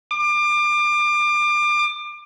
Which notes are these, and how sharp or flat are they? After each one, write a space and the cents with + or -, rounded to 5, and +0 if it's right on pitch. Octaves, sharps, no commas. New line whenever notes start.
D6 +30